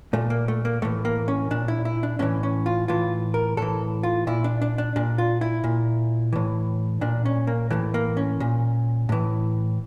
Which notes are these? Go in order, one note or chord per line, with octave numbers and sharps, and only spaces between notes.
A#2 A3
A#3
A3
A#3
A2 E3 A3
A#3
C#4
A#2 D4
E4
E4
D4
A2 E3 C#4
C#4
F4
A2 E3 F4
A#4
A2 E3 A4
F4
A#2 E4
D4
D4
D4
A#2 D4
F4
E4
A#2
A2 E3
A#2 D4
C#4
A#3
A2 E3 A3
A#3
C#4
A#2
A2 E3